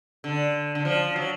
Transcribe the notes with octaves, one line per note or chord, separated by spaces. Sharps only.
D3
D3
F3
F#3